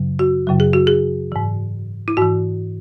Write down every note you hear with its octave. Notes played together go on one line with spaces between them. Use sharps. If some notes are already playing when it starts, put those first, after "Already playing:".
Already playing: F#2 C#3 F#3
F#4
F#2 C#3 F#3
G#4
F#4
G#4
G#2 E3
E4
G#2 E3 F#4